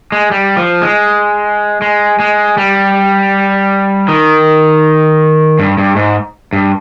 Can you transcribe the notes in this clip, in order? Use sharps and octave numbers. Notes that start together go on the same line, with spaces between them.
G#3
G3
F3
G#3
G#3
G#3
G3
D#3
G2
G2
G#2
G2